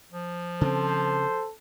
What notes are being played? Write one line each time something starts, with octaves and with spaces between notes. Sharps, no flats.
F3
C#3 C4 A4 C5